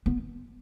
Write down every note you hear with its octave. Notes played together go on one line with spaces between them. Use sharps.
B3